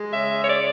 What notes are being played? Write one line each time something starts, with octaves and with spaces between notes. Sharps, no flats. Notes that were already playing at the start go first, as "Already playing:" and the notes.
Already playing: G#3
C#3 E5
C#5
D5